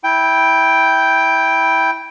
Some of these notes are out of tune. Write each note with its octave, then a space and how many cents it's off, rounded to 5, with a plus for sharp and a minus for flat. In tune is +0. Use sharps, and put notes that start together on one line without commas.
E4 -15 G5 +0